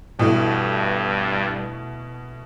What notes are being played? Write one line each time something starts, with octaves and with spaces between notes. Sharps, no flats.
G2 B2 E3 A3